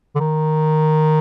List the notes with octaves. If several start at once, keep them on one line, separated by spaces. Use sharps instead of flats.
D3
D#3